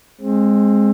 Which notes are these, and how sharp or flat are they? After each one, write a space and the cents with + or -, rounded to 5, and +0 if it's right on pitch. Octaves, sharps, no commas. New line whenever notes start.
G#3 +5 C4 +25